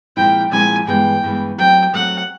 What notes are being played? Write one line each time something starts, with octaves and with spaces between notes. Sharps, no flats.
A#2 F3 G#3 C4 E4 G5
A#2 F3 G#3 C4 E4 G#5
G2 E3 G#3 B3 G5
G2 E3 G#3 B3
F#3 A3 C4 G5
F#3 A3 C4 F#5